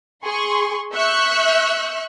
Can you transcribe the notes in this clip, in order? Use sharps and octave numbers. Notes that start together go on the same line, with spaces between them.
G#4 C6 C#6
E5 C#6 E6 F#6 G6